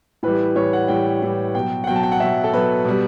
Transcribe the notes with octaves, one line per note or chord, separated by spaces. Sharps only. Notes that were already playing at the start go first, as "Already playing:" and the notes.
A2 E3 G3 B4
A2 E3 G3 C#5
F#5
A2 E3 G3 G5
A2 E3 G3
B2 F#3 G5
F#5
B2 F#3 G5
A5
G5
F#5
B2 F#3 E5
A4
B2 F#3 B4
B2 G3